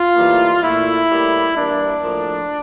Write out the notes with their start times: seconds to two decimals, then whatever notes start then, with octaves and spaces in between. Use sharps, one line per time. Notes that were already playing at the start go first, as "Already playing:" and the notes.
Already playing: F4
0.15 A2 E3 G3 A#3
0.62 A#2 A3 E4
1.08 A2 G3 A#3
1.56 G2 E3 A#3 D4
2.02 A2 F3 A#3